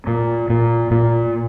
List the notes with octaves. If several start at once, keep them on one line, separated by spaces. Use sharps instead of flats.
A#2
A#2
A#2